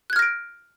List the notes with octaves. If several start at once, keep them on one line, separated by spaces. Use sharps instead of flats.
F6 F#6 G#6 A#6 D7